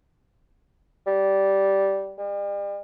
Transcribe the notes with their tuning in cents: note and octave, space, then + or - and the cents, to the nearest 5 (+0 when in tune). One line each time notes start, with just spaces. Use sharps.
G3 -10
G3 +40